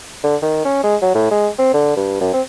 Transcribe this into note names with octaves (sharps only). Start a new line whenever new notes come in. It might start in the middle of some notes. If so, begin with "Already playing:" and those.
D3
D#3
C#4
G#3
F#3
A2
G#3
C4
D3
G2
F#2
C4